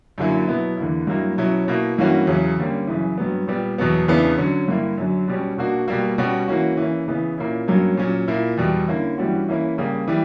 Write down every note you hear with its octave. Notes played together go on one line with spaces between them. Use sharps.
F#2 D3 F#3 A#3 E4
B2 F#3 B3 E4
E2 D3 A#3 E4
G2 F#3 A#3 E4
B2 F#3 C#4 E4
B2 A#3 E4
G2 E3 A#3 C#4 F#4
E2 C#3 F#3 C#4 E4
D3 G3 A#3 C#4
F#2 C#3 E3
G2 F#3 B3
A#2 G3 B3
E2 B2 F#3 B3
E2 C#3 E3 B3 D4
D3 F#3 C#4
G2 D3 A#3 E4
F#2 D3 F#3
B2 G3 C#4
B2 A#3 D4 F#4
B2 G3 A#3
B2 G3 C#4 F#4
E3 A#3 C#4 F#4
E3 A#3 C#4
C#3 E3 B3
A#2 A#3 C#4 E4
G2 F#3 A#3 C#4
A#2 F#3 C#4
A#2 A#3 E4
E2 B2 G3
D3 A#3 C#4 E4
G2 E3 G3 C#4 F#4
E3 A#3 C#4 E4
C#3 G3 A#3
E3 G3